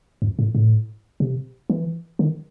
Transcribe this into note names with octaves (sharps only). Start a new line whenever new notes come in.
F#2
A2
A2
C3
E3
D#3